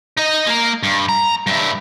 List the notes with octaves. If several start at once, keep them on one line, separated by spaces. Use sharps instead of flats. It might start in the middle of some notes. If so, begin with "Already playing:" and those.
D#4 D#5
A#3 A#4
G2
A#5
G2 E4